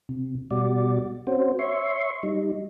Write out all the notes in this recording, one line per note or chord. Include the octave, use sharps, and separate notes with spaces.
C3
B2 G3 F#4 D5
C4 C#4 F#4 C5
C#5 E5 C6 C#6
G3 D#4